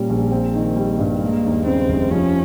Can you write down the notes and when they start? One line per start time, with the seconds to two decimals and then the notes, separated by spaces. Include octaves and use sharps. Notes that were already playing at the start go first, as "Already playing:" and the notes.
Already playing: A#2 G3 A#3 C#4
0.09 A#1
0.31 C4
0.54 D#3
0.76 G3
0.99 G2
1.21 G#3 A#3
1.44 D#2
1.66 C#3 C4
1.88 F1
2.11 F3 C#4